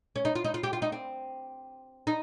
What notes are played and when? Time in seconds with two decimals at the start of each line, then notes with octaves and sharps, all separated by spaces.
0.16 C#4
0.25 D#4
0.35 F4
0.44 D#4
0.54 F4
0.63 G4
0.73 F4
0.82 D#4
0.92 C4
2.07 D#4